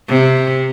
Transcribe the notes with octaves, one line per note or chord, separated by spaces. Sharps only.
C3